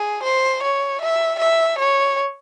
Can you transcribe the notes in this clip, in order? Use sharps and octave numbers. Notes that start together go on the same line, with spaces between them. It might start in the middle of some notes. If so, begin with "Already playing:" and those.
Already playing: G#4
C5
C#5
E5
E5
C#5